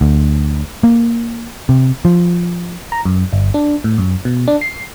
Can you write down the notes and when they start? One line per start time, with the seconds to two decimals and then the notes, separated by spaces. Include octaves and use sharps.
0.01 D2
0.83 A#3
1.69 C3
2.05 F3
2.92 A#5
3.05 F#2
3.33 G1
3.54 D4
3.84 A2
3.98 F#2
4.25 B2
4.48 D4
4.61 C7